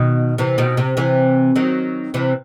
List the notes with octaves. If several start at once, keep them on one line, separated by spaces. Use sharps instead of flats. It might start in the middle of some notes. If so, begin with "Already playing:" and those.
Already playing: B2 D#3
C3 E3
B2 D#3
C3
C3 E3
D#3 F#3
C3 E3